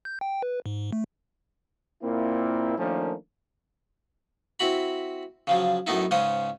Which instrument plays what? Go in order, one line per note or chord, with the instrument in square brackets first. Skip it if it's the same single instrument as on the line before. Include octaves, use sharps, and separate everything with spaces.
[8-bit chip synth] G6
G5
B4
G#2
A3
[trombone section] A#2 A#3 C4 E4
D#3 F3 A3 A#3 C#4 D4
[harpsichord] C4 E4 F#4 B5
C#3 F3 F#3
F#2 A2 A3 B3 D#4 E4
C#2 G#2 C#3 C#4 C5 D#6